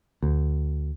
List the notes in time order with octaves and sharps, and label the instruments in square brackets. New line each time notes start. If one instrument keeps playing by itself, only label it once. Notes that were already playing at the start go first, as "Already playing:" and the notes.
[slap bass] D2